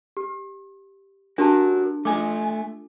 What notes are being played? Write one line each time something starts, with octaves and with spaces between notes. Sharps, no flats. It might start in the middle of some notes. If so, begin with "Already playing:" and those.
G4
D4 F#4 G4 A#4 A5
A3 F4 A4 G#5 D6